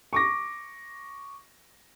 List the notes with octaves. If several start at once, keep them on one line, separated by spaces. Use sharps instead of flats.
C#6 D6 A#6